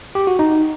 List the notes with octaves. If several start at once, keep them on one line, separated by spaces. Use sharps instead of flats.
G4
F#4
D#4